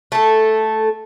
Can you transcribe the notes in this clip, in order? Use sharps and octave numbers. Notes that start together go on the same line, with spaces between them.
A3 A4